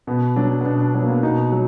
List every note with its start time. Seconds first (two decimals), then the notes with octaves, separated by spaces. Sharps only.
0.07 B2 B3
0.36 F#3 D4
0.61 B3
0.65 B2 D4
0.80 D4
0.94 F#3 B3
1.02 A#3
1.08 B3
1.23 B2 D#4
1.52 F#3